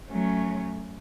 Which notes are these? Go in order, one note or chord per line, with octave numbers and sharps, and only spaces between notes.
F#3 A3 C#4